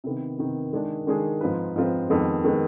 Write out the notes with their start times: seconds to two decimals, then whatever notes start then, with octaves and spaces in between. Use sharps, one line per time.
0.04 C3 D#3 B3
0.38 C3 D#3 B3
0.73 D#3 G#3 D4 G#4
1.07 D#3 G#3 D4 G#4
1.41 G#2 F3 C4 F4 B4
1.76 G#2 F3 C4 F4 B4
2.09 F2 D#3 G#3 B3
2.44 D#3 G#3 B3